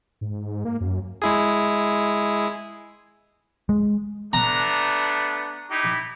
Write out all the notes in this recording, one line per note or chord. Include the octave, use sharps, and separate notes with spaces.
G#2
A#3
F#2
G#3 E4 G#4
G#3
A3 B3 D4 A#5
D#4 E4 G4